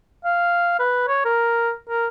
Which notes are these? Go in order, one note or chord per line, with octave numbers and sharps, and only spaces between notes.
F5
B4
C#5
A#4
A#4